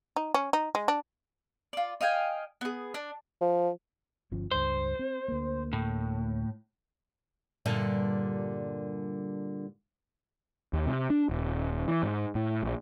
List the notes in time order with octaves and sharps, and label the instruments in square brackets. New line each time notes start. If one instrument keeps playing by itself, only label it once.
[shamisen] D#4
C#4
D#4
G#3
D4
[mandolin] F4 D5
D#5 F5 G5 G#5
B3 G#4
D4
[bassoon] F3
[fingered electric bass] G1 F3 C#4
[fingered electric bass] C#2 G2 [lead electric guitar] C5
[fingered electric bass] C4
D2 A#3
[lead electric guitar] A2
[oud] G2 A#2 D3
[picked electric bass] D#2
C3
D4
D#1
E3
G#2
A2
A#1